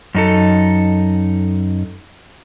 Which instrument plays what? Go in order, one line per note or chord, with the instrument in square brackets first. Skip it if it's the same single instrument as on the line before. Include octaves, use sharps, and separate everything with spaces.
[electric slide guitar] F#2 D#4 A4